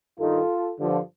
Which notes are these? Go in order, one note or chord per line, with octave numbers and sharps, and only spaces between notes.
G2 D#3 F4 A4
G2 D3 F3